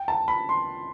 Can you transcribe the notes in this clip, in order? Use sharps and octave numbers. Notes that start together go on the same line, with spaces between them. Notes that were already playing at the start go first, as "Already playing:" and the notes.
Already playing: G5
A5
B5
C6